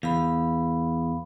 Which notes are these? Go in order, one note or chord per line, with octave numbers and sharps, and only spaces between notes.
E2 F5 B5